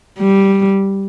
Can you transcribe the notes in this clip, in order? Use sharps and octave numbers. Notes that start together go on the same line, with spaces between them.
G3